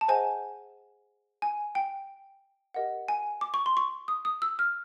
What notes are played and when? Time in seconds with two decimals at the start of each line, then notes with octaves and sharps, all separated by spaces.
0.01 A5
0.08 G#4 C5 D#5 F#5 G#5
1.42 G#5
1.75 G5
2.74 G4 A#4 D#5 F#5
3.08 G#5
3.41 D6
3.54 C#6
3.66 C6
3.77 C#6
4.08 D#6
4.25 D#6
4.42 E6
4.59 F6